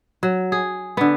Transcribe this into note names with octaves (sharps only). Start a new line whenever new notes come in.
F#3
G#4
D3 B3